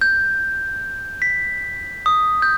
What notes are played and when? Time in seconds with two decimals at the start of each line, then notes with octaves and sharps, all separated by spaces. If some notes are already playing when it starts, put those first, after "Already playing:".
0.01 G6
1.22 B6
2.06 D#6
2.42 G6